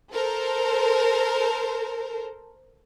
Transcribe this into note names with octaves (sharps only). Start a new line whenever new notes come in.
A4 A#4 C5